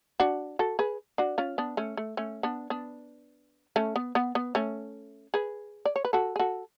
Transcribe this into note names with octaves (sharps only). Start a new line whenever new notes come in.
D4 F#4
F#4 A4
G#4 B4
D4 F#4
C#4 F4
B3 D4
A3 C#4
A3
A3 C#4
B3 D4
B3 D4
A3 C#4
B3
B3
B3
A3 C#4
G#4 B4
D5
C#5
B4
F#4 A4
G#4
F#4 A4